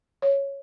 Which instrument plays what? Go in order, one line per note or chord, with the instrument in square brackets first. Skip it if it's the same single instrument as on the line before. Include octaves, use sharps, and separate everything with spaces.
[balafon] C#5